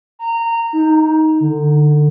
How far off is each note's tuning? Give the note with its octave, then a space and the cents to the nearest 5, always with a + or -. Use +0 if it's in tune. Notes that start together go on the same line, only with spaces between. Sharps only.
A#5 -20
D#4 +15
D3 +20